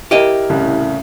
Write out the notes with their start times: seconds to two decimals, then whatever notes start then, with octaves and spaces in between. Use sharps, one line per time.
0.11 E4 G4 A#4 D#5
0.49 C2 A2 C#3